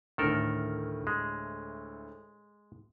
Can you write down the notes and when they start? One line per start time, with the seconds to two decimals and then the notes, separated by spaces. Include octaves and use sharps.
0.18 D2 A2 D#3 A4 A#4
1.07 G#3